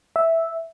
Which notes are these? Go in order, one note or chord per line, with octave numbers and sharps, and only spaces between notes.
E5